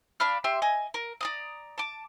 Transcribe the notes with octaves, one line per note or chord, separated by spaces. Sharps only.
D4 F5 B5 F6
G4 E5 C6
D#5 G#5
A#4
D5 A#5 D#6
A5 D6